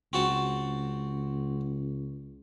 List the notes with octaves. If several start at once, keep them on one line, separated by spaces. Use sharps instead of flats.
C#2 C4 F#4 A5